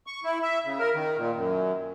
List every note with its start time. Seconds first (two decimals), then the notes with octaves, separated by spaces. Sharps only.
0.07 C#6
0.24 E4
0.42 E5
0.65 C#3
0.79 A#4
0.94 D#3
1.17 A#2
1.36 F#2